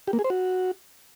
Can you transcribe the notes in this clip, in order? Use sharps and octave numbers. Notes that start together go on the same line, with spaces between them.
G4
A#3
G#4
C5
F#4